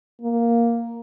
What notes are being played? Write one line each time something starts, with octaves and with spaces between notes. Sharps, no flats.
A#3